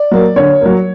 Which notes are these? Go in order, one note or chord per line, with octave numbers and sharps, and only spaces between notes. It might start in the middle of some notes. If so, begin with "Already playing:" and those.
Already playing: D5
F#3 A#3
D3 C#5
F#3 A#3